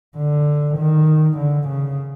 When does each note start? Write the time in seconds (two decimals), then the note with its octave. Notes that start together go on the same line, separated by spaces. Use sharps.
0.17 D3
0.78 D#3
1.38 D3
1.68 C#3